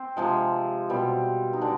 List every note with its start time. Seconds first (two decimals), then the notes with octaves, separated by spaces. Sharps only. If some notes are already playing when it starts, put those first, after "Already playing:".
Already playing: C4
0.17 C3 F3 G#3
0.89 B2 G3 C4
1.53 D#4
1.61 D3 G#3 D4